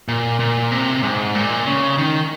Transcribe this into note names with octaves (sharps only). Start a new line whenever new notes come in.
A#2
A#2
C3
G#2
A#2
C#3
D#3